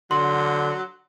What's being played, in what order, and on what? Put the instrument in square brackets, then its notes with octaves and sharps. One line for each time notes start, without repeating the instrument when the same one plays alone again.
[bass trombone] D3 [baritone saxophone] F#3 [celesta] C6